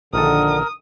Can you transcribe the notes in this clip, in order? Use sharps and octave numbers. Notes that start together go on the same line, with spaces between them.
A#1 D3 D#3 A4 A#4 D#6